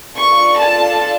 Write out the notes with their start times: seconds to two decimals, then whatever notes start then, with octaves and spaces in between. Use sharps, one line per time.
0.17 D4 F4 A4 C#6
0.59 A5